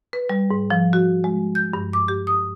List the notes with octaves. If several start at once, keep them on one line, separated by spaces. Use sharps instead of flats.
B4
G3
G#2
F3
F#4
G#3
G6
G2
D6
G4
D#6